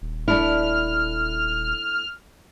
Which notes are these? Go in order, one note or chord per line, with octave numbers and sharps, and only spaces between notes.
D#1
A3 D4 E4 F6